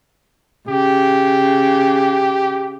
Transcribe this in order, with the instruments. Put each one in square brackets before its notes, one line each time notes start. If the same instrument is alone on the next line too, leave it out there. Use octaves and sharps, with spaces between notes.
[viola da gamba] C#3 [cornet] G4